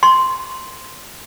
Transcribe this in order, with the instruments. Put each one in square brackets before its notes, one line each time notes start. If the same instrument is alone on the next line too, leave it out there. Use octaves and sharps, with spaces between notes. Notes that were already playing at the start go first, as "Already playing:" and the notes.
[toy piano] C6